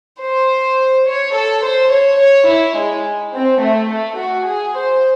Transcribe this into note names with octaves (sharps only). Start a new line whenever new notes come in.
C5
C#5
A4
C5
C#5
C#5
E4
G#3
C4
A3
A3
F#4
G#4
C5